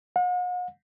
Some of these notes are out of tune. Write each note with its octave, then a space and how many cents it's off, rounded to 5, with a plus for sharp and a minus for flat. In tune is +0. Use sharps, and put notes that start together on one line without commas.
F#5 -45